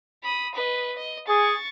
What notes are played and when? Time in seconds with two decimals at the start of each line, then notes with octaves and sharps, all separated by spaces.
0.23 B5 D#6
0.54 B4 D#5
0.95 D#5
1.27 G#4 C#6 A6